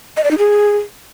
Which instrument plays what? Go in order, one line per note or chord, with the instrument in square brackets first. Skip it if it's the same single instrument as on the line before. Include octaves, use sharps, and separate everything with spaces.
[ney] D#5
D5
D#4
G#4